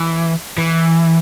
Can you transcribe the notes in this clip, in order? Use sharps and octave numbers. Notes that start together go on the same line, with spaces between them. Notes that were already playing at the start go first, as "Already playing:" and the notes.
Already playing: E3
E3